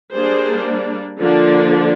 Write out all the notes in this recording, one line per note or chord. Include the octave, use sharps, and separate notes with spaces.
G3 A#3 D4 G#4 C5
D3 F3 A#3 D4